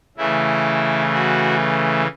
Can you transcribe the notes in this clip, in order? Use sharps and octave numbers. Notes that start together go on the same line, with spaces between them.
C#3 E3 A3 E4
F#4